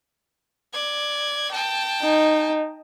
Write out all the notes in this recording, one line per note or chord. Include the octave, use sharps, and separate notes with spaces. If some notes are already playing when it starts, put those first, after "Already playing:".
D5 G#6
G5 A5
D#4